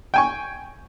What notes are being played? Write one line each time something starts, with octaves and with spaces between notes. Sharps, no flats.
G5 G#5 C#6